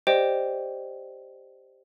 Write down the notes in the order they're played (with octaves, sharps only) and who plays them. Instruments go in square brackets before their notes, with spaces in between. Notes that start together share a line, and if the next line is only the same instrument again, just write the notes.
[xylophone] G4 C5 D5 D#5 G5